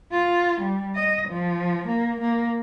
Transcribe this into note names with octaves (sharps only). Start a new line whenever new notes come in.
F4
G3
D#5
F3
A#3
A#3